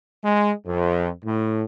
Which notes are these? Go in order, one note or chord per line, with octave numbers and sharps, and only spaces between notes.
G#3
F2
A2